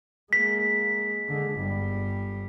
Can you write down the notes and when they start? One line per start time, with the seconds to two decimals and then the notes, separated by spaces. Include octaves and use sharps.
0.33 G#3 A#3 B6
1.29 D3 G#3
1.58 G1 G3